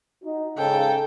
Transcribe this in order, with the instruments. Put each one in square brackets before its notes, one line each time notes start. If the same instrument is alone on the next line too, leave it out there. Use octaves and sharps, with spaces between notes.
[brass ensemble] D#4 F#4
[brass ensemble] G#2 C#3 [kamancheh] A4 G5